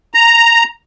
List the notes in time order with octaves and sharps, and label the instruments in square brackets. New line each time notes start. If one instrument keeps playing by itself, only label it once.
[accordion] A#5